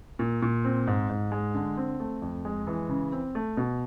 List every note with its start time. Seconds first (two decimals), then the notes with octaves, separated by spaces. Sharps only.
0.19 A#2
0.42 A#2
0.64 C4
0.87 G#2
1.09 G#2
1.32 G#3
1.54 D3
1.77 C4
2.00 A3
2.22 F2
2.45 G#3
2.67 E3
2.89 C#3
3.12 C4
3.35 A3
3.57 B2